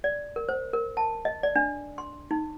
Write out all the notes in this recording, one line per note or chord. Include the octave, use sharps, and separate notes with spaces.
D5
A#4
C5
A#4
A5
D#5
D5
D4
C6
D#4